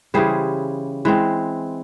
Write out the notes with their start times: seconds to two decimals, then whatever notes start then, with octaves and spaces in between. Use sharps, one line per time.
0.14 C#3 E3 G3 G#4 C5
1.05 E3 G#3 C4